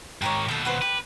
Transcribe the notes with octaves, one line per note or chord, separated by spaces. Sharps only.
G#2 D#3 G4 A#4 C#5
D#2 B2 A4 G6
F#4 B4 C5
G4 B4